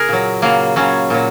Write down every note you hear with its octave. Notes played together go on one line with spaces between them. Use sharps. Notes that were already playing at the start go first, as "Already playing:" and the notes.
Already playing: C#3 G#4 A#4
A#2 F#3
C#3 F#3 A#3
C#3 F#3 C#4
A#2 F#3